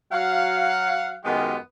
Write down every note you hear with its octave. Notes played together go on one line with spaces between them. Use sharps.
F#3 F5 F#5
F#2 D#3 G#3 B3 F4 G4